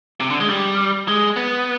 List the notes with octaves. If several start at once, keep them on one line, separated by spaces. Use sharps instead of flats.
C3
D3
G#3
G3
G#3
B3